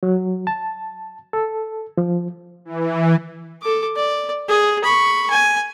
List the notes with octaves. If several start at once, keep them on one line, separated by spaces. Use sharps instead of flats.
F#3
A5
A4
F3
E3
A4 D6
D5
G#4 D#6
B5 C#6
G#5